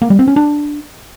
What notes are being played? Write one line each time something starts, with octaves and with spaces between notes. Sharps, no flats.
A#3
G3
C4
C#4
D4